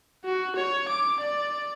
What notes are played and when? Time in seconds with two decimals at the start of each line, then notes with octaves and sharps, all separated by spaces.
0.25 F#4
0.56 C#5
0.89 D6
1.20 D5